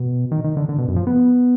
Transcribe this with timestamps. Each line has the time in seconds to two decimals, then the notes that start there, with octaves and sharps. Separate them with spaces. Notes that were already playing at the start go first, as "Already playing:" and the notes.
Already playing: B2
0.32 D#3
0.44 D#3
0.57 D3
0.69 D3
0.78 B2
0.88 F#2
0.96 F3
1.07 B3